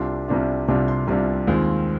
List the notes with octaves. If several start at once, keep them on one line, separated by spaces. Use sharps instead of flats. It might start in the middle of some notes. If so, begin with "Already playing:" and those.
Already playing: C2 C3 G3 D4 F4 C6
C2 C3 G3 D4 F4
C2 C3 G3 D4 F4
C6
C2 C3 G3 D4 F4
D#2 D#3 G#3 C4 F4